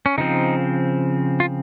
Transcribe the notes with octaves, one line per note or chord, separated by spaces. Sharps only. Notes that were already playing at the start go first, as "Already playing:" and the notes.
C#4
C#3 F3 C4 D#4
F4